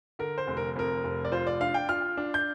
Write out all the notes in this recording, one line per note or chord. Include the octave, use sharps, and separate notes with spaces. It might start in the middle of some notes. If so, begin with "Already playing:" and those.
D3 A#4
C5
F1
A#4
F2 A#4
F1
D5
F4 C5
D5
D4 F5
G5
F4 F6
D4
G6